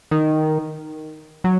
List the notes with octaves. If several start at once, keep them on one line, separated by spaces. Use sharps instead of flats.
D#3
F#3